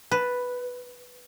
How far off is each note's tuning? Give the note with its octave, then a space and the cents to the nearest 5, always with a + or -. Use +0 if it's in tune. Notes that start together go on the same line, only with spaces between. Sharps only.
B4 +0 A5 +0